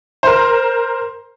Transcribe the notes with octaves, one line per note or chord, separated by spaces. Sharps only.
A#4 C5